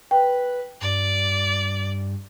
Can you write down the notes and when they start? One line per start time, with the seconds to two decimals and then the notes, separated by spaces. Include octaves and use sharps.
0.11 B4 G5
0.81 G2 D5